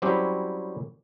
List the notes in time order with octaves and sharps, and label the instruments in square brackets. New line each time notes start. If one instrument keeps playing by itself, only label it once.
[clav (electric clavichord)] F#3 G3 C4 C#4 E4 G4